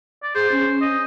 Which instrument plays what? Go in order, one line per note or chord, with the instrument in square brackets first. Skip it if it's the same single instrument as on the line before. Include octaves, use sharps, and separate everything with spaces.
[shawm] D5
[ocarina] G#4 [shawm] C5
[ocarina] C#4
[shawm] D#5